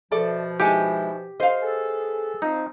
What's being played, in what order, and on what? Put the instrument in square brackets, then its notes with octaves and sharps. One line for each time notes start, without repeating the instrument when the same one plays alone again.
[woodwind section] B2 F3 [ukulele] A4 D5 E5
[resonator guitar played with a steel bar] G#3 E4 [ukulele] D#4 G#5 A5 [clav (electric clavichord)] G4
[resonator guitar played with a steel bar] C5 F5 [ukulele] D#5
[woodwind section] B3 G#4 A4
[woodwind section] F3 C4 [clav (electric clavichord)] D#4